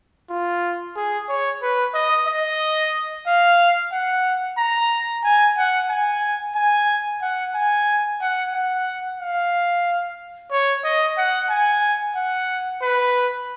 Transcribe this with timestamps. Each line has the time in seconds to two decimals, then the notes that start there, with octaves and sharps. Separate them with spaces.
0.30 F4
0.96 G#4
1.29 C#5
1.62 B4
1.94 D#5
2.27 D#5
3.27 F5
3.93 F#5
4.58 A#5
5.24 G#5
5.58 F#5
5.90 G#5
6.56 G#5
7.22 F#5
7.55 G#5
8.21 F#5
8.54 F#5
9.20 F5
10.51 C#5
10.84 D#5
11.18 F#5
11.50 G#5
12.16 F#5
12.83 B4